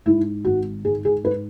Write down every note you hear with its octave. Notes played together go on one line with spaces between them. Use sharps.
G#2 E4
G#1 F#4
G#2 G#4
G#4
G#2 B4